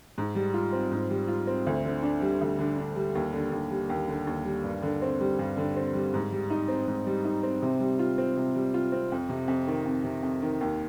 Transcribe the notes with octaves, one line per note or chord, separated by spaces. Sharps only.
G#2
G3
F4
C4
G#2
G3
F4
C4
D2
D3
D4
G3
D2
D3
D4
G3
D#2
D3
D#2
G3
D#2
D3
D#2
G3
G2
D3
C4
G3
G2
D3
C4
G3
G#2
G3
D#4
C4
G#2
G3
D#4
C4
C3
G3
F4
C4
C3
G3
F4
C4
F2
C3
F2
D#3
F2
C3
F2
D#3
D#2